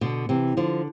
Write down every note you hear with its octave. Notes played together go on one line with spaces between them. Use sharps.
B2 D3
C3 E3
D3 F3